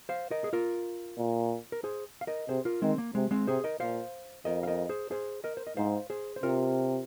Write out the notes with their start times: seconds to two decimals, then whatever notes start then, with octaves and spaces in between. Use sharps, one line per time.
0.09 C5 F5
0.31 A#4 D#5
0.44 G#4
0.53 F4 A#4
1.18 A#2
1.72 A#4
1.84 G#4 C5
2.21 F5
2.27 A#4 D#5
2.49 C3 G#4 C5
2.65 F4 A#4
2.82 D#3 G#3 C4
2.98 A#3
3.15 C3 G#3
3.31 G#3 C4
3.47 C3 G#4 C5
3.64 A#4 D#5
3.80 A#2 C5 F5
4.45 F2 A#4 D#5
4.63 F5
4.67 A#4 D#5
4.89 G#4 C5
5.11 G#4 C5
5.44 A#4 D#5
5.57 C5
5.67 D#5
5.77 G#2 C5 F5
6.10 G#4 C5
6.36 C5
6.43 C3 F4 A#4